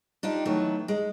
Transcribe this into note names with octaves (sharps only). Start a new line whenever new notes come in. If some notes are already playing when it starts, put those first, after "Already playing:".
D4 D#4 F4 G4
D#3 E3 F#3 A3 B3
G#3